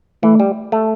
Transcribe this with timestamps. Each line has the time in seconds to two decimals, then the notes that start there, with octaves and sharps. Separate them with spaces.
0.23 E3 A3
0.40 G3
0.72 A3